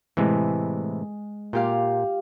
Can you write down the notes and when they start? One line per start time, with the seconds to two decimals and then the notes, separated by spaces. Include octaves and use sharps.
0.17 A2 C3 E3 G#3
1.53 A#2 F4 G4 F5